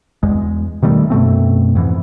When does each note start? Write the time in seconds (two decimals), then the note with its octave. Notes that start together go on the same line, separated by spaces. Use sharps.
0.23 E2 G#3
0.82 B2 D#3 G3 A3
1.10 F#2 B2 A3 C4
1.75 F2 G#2 E3